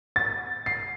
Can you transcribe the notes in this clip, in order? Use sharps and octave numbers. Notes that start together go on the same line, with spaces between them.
A6
C7